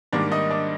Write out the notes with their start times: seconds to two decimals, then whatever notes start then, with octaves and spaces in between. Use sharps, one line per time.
0.12 G#2 D#3 G3 A#3 D4 D5
0.32 D#4 D#5
0.50 D4 D5